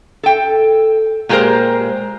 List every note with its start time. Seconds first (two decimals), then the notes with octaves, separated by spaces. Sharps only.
0.23 A4 G5
1.29 A#2 G#3 G4 G#4 A#4 C5